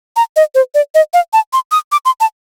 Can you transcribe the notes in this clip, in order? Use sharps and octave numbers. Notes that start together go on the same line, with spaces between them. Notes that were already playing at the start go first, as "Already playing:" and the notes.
A#5
D#5
C5
D5
D#5
F5
A5
C6
D#6
D6
C6
A5